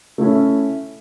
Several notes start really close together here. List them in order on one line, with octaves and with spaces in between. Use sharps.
A3 E4 C#4